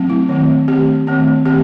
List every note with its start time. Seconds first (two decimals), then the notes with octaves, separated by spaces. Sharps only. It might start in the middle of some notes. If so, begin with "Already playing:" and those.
Already playing: F#3 A3 C4
0.10 E4
0.29 D#3 A3 C4
0.68 D#3 A3 C4 G4
1.07 D#3 A3 C4
1.45 D#3 A3 C4 G4